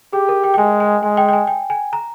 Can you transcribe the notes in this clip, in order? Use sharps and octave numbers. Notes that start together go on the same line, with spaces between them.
G4 G#4
A#4
G5
G5
G#3 G#5
G#5
G#3 G#5
G5
G5
G#5
G5
G#5
A#5